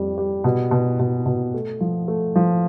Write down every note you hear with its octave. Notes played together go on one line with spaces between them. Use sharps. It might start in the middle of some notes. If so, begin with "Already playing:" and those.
Already playing: F2 G3
G3
B2
B2
B2
B2
A3
F3
A3
F3